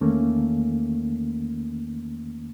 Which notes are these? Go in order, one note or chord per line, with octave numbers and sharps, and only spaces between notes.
E2 D#3 A3 A#3 C#4